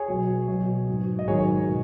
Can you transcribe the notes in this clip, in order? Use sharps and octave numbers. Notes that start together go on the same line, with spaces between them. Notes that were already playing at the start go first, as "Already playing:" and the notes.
Already playing: G#4 C#5
B2 F#3
B2 F#3
G#2 F#3
D#5
G#2 D#3 F#3 G#4 C#5
B2